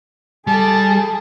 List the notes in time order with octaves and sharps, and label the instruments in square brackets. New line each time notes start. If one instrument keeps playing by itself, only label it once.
[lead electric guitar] G3 [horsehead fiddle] G#4 A4 [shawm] A5